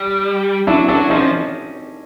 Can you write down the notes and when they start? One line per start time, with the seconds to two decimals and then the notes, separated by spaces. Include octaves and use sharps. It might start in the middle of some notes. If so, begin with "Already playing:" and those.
Already playing: G3
0.67 F#3 D4 E4
0.88 F#3 D4 E4
1.10 F3 C#4 D#4